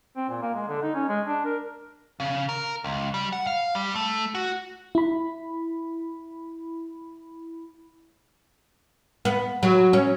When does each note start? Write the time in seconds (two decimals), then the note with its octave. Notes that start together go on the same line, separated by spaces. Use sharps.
0.16 C4
0.29 A#2
0.42 A#3
0.54 G#3
0.68 D3
0.82 D#4
0.94 C#4
1.09 G#3
1.27 D4
1.45 A#4
2.20 C#3
2.49 A#4
2.84 C#2
3.14 G3
3.33 F#5
3.47 F5
3.75 G3
3.95 A3
4.35 F#4
4.95 E4 B5
9.25 B3
9.63 F#3
9.93 C#4